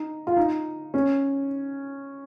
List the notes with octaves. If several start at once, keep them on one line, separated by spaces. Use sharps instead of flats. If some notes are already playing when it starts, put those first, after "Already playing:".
Already playing: D#4
F4
D#4
C#4